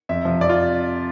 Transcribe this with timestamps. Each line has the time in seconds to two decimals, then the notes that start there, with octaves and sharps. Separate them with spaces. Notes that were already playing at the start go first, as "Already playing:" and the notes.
0.09 F2 E5
0.25 C3 F3
0.41 F2 D5
0.49 F4